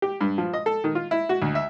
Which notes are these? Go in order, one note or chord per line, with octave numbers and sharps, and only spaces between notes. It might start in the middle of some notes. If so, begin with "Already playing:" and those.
G4
G2
F3
D#5
A4
D#3
F4
E4
F#4
D2
E5